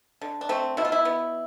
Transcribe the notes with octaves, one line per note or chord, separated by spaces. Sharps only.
D3
D4
A3 C4
B2 E4
F4
E4
B3